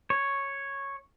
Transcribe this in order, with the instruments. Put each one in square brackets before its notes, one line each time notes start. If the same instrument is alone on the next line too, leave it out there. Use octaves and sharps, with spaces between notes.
[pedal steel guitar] C#5